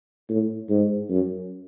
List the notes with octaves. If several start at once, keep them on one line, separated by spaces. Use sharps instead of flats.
A2
G#2
F#2